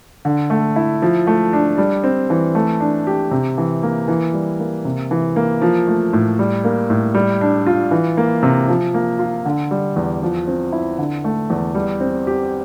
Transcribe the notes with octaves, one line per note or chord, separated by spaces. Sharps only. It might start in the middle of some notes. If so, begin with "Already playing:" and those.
D3
A3
E4
F3
A3
D4
G3
C4
E3
A3
D4
G4
C3
E3
A#3
E3
G3
A#3
C3
E3
A#3
F3
A3
A2
G3
A#3
A2
G3
D4
F4
E3
A#3
C3
F3
A#3
F4
D3
G3
E2
F3
C4
E4
D3
A3
E2
G3
C4
G4